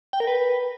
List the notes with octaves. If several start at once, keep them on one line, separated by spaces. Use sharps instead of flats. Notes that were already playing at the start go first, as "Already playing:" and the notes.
G5
A#4
B4